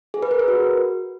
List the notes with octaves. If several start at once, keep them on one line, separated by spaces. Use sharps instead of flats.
G#4
B4
A#4
B4
F#4